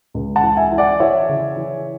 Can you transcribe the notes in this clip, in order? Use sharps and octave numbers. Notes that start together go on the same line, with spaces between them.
C#2
F#5 A5
E3
E5 G#5
E3
D5 F#5
E3 C#5 E5
C#3
E3